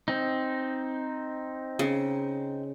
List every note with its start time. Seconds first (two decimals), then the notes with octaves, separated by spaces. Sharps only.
0.08 C4 D#4
1.79 C#3